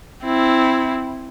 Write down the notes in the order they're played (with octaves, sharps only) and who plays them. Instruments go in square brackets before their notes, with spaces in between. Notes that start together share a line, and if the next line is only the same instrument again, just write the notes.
[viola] C4 E4